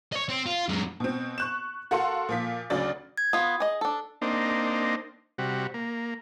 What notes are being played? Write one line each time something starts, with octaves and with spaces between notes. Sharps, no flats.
C#5 D#5
C4
F4
F#2 G#3
B2 C4
C#6 F#6 E7
F#4 A4 A#4 F5 F#5 C6
A#2 F3 B6
D2 C#3 F#3 D5 A6
G#6
B3 F4 D#6
G#4 D#5
D4 A4
A#3 C4 D4 D#4
C3 G3 F#4
A#3